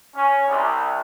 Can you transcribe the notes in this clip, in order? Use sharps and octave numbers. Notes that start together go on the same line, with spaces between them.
C#4
C2